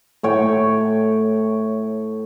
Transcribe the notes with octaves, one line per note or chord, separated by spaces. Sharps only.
A2 C#5 G5